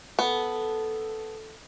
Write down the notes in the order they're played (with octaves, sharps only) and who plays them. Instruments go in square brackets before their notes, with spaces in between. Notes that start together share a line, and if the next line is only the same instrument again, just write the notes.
[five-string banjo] B3 [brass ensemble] A4